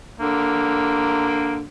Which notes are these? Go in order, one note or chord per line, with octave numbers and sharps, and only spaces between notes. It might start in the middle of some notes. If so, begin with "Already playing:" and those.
D3 A#3